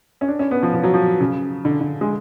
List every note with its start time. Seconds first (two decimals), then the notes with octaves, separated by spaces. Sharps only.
0.21 C#4
0.28 D4
0.39 C#4
0.51 B3
0.63 F3
0.74 F3
0.84 F#3
0.94 F3
1.20 C#3
1.65 D3
1.81 D3
2.01 G#3